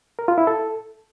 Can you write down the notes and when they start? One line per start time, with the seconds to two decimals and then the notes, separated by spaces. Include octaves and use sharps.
0.19 A#4
0.28 F4
0.38 E4
0.47 A4